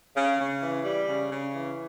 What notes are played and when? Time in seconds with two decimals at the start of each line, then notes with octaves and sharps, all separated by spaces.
0.16 C#3
0.39 C#3
0.62 E3
0.85 G3
1.08 C#3
1.31 C#3
1.53 E3